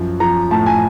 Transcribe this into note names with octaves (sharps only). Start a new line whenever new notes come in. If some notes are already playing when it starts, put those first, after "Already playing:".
Already playing: F#2 F3
F3 A#5
A2 A5
G#5